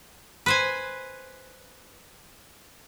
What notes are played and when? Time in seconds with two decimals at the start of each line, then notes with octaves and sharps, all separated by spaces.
0.46 B4 C5 G#5